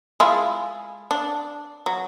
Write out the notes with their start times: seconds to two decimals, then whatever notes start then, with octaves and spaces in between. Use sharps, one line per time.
0.20 G#3 E4 F4
1.11 D4
1.86 F#3